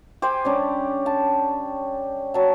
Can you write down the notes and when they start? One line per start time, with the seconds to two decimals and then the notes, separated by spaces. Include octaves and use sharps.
0.22 G4 C5 G5 G#5
0.45 G3 C#4 D4
1.06 A5
2.34 F#3 A5